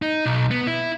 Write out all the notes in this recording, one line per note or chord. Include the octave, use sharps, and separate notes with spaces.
D#4
B1
B3
E4